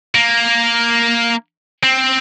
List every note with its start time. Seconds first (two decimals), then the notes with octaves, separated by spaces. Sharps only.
0.15 A#3
1.83 C4